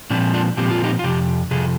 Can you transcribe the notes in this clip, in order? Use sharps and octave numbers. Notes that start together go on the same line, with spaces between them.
A#2 F3 C4 D4
D4 F4
A#2 F3 C4 G4
F4
D#4 G4
F4
F2 C3 G4
F2 C3 G#4